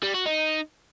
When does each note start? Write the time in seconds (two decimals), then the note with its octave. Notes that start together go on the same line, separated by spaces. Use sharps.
0.03 G3
0.14 F#4
0.26 D#4